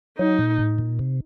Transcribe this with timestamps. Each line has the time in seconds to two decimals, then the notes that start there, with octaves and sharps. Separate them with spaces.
0.18 F#3 D#4
0.39 A#2
0.58 A2
0.78 A#2
0.99 C3